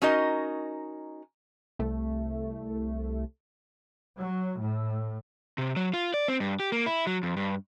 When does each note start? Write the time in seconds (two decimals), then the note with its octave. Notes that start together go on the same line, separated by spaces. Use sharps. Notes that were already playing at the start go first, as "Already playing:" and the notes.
0.02 C#4 D#4 F#4 A#4 D#5
1.79 C2 A3
4.20 F#3
4.58 A2
5.58 C3
5.76 F#3
5.94 F4
6.14 D5
6.28 C4
6.40 G2
6.60 G4
6.72 A#3
6.86 E4
7.07 F#3
7.23 F2
7.37 G2